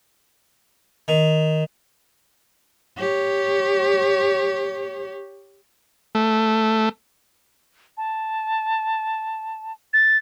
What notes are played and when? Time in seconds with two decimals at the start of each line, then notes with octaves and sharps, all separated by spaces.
1.08 D#3
2.97 G4 C#5
6.15 A3
7.97 A5
9.93 A6